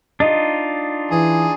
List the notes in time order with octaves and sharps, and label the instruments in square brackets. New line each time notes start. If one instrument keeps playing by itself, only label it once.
[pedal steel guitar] D4 D#4 F4 [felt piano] D#5
[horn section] E3 [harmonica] G#4